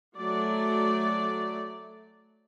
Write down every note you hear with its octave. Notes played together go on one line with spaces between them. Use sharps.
F#3 A3 D5